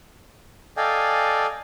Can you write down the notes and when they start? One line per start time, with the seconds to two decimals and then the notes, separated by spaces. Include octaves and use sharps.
0.77 A4 D5 D#5 F5 G5 G#5